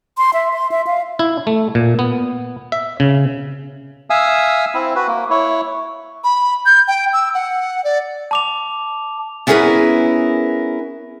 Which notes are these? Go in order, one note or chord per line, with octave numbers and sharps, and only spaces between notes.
C6
E5
C6
E5
F5
E4
A3
A#2
B3
E5
C#3
E5 F5 G#5 D#6 E6
C4 E4
F#4 B4
A#3
E4 C#5
B5
G6
G5
E6
F#5
D5
A5 D6 F7
B3 C#4 E4 G#4 A#4 B4